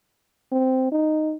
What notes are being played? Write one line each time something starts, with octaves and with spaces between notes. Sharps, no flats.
C4
D#4